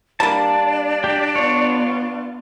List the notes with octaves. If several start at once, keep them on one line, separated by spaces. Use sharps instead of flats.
G3 A#3 D4 D5 A5
G4
B3 F4 C#5